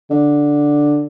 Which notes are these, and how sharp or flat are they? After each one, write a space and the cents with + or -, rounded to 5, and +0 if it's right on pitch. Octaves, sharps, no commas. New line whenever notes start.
D3 +0